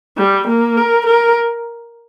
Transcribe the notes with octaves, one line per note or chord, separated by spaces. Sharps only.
G3
A#3
A#4
A#4